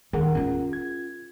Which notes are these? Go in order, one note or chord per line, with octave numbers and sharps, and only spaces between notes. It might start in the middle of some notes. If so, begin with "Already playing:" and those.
D#2 G#4 A#4 F#5
C#4 F4
G#6